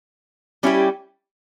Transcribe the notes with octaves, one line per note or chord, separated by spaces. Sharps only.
G3 C#4 E4 G4